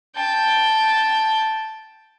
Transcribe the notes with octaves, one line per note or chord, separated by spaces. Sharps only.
G5 A5